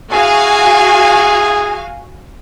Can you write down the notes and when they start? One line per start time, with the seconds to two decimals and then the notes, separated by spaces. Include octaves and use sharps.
0.12 E4 F#4 G#4 F5 G#5